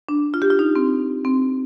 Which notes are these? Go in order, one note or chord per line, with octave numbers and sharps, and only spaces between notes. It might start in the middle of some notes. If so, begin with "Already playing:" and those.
D4
F4
G4
F4
D#4
C4
C4